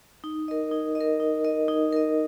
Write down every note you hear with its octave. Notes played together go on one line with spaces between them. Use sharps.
D#4
A#4 D#5
D#4
D#5
A#4
D#4
A#4 D#5
D#4
A#4 D#5